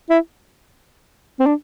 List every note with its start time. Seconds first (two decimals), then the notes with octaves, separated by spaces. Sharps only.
0.10 E4
1.40 C4
1.46 D4